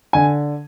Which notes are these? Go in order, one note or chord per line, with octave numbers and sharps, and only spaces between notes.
D3 G#5